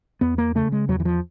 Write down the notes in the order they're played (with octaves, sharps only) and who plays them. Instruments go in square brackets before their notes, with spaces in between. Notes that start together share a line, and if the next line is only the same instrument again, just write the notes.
[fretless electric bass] E2 B3
A#3
C#3 A3
G#3
E2 F#3
E3
F3